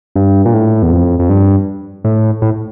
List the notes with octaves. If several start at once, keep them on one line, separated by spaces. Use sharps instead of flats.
G2
A#2
A2
E2
F2
F2
G2
A2
A2